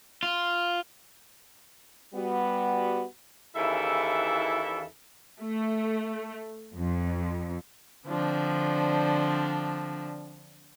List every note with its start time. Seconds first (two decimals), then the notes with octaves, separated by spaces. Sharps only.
0.23 F4
2.14 G3 B3 F#4
3.56 D#2 C#3 E3 E4 A4 E5
5.40 A3
6.76 F2
8.06 D3 F3 C4 D4